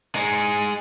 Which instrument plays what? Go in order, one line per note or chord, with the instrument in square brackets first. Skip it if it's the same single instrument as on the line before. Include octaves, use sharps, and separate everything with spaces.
[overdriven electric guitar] G#3 D#4